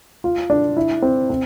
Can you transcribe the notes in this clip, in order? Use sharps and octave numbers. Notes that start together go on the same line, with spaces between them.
F4
D4
E4
C4
C4